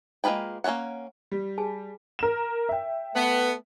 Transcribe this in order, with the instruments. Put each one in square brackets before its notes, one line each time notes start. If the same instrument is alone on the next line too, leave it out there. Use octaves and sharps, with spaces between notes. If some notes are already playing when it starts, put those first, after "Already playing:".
[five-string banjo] G#3 A#3 F4 B4 G5
A#3 C#4 E4 C#5 F#5
[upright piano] G3
[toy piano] G#4 G#5 A5
[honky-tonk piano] A#4 E7
E5 G5
[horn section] A3 B3